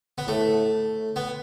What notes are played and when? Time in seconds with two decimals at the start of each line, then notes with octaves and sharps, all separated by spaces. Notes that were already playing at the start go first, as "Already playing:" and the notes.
0.18 B3
0.27 A2 A3
1.16 B3